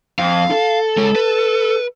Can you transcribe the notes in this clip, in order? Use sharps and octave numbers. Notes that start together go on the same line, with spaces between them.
F2 F5
A4
G#3 C#5
B4